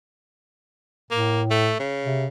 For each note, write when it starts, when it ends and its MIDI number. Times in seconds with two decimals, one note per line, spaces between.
1.11 1.75 45
1.11 1.42 58
1.51 1.77 57
1.80 2.28 49
2.05 2.26 48